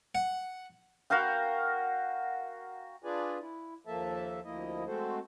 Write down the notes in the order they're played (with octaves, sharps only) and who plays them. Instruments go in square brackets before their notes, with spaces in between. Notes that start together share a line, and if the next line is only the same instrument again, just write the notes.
[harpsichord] F#5
[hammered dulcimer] F#4 A#4 F5 G5
[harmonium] D4 F4 G#4 B4 D5 G#5
E4
D#2 F3 A#3 A4 E5 A5
D2 F3 A#3 E4 D#5
G#3 A3 C4 F#4 A4 C5